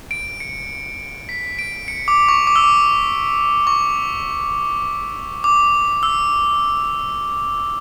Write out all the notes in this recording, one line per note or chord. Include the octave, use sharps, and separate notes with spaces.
D7
C#7
B6
D7
C#7
D6
C#6
D6
E6
D6
C#6
D6
E6